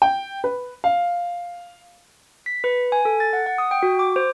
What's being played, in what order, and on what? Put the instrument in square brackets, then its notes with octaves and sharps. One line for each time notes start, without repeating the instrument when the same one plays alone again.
[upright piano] G5
B4
F5
[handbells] B6
B4
G#5
A4
A6
F#5
F#5
D#6
G5
F#4
D6
C5